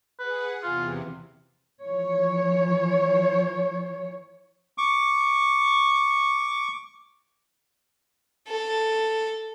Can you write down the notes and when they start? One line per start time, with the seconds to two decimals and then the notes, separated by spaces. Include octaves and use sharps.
0.19 G#4 B4 F#5
0.63 E2 C3 E3 F4
1.84 E3 F3 C#5
4.78 C#6 D6
8.48 A4